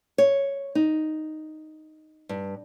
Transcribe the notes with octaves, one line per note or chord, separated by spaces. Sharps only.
C#5
D#4
G2